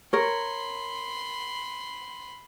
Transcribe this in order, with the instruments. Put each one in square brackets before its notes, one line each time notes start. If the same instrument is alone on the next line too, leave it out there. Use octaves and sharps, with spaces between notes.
[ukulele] A#4 C#5 [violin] B5 C6